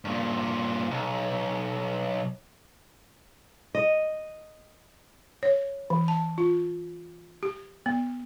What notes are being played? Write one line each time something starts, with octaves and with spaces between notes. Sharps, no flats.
G2 A#2
B1
D#5
C#5
E3
A5
F4
G4
B3